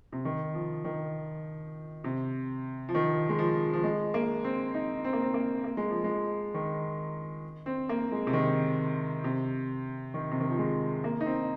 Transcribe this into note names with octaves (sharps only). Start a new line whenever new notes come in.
C3
D#3
F3
D#3
C3
F3
D#3
G#3
F3
F3
G#3
A#3
C4
D#4
C4
A#3
C4
A#3
A#3
G#3
F3
G#3
D#3
C4
A#3
G#3
C3
D#3
C3
D#3
C3
D#3
F3
G#3
A#3
D#4
C4